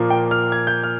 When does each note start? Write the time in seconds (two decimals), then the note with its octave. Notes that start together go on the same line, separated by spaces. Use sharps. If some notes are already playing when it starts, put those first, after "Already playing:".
Already playing: A#2 F3 A#3
0.10 G5
0.31 F6
0.52 G#6
0.67 G6
0.83 F6